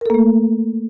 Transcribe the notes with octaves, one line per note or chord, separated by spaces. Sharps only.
A3 A#3 A4 A#4